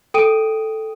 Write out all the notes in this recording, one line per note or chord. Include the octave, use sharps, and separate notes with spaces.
A4 G5 D#6 D7 D#7